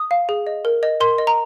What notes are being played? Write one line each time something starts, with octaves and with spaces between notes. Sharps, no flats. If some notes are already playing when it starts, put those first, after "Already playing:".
Already playing: D#6
F5
G#4
D#5
A#4
D#5
A#4 C6
D#5
A#5